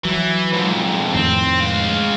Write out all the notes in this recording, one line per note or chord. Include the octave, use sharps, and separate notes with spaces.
E3 F#3
F2 G#2
F2 A2 D#3 C4
G#3 F5